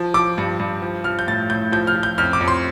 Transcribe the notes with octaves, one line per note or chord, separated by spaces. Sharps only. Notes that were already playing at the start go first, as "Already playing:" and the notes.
Already playing: F3
F3 D6
G2
G2
F3
F3 F6
G6
A2 A6
A2 G6
F3 G6
F6
F3
G6
F2 F6
D6
F2
C6